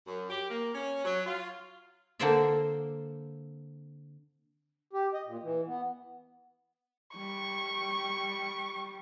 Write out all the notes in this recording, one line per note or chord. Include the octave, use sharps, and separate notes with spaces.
F#2
G4
A#3
C#4
F#3
F4
D3 A#3 C4 C5 D5 E5
G4
D#5
A#2
E3
B3
G3 C#6